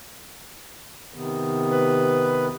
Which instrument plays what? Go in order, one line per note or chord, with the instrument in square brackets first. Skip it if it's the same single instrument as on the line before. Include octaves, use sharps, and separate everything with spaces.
[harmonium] C3 D#3 B3
[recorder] B4